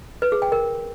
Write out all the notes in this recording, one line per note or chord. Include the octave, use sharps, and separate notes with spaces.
B4
G#4
G5
A#4